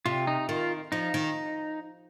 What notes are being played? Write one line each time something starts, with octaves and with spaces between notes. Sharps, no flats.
C3 F4
D#4
D#3 F4
F3 D#4
D#3